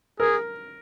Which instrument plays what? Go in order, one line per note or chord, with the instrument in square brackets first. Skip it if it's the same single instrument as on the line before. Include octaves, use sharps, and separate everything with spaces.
[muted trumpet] G#4 [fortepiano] A#4